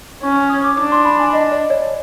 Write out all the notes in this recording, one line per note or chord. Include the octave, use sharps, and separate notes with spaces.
C#4 C#6
D#6
D6
D4 D6
C6
B5
G#5
D#5
D5
C#5